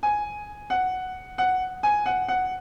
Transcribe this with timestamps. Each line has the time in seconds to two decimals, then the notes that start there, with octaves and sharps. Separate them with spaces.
0.03 G#5
0.70 F#5
1.38 F#5
1.83 G#5
2.06 F#5
2.28 F#5